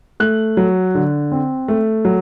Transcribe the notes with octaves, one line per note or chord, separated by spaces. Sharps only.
A3 F#6
F#3
D3
C4
A3
F#3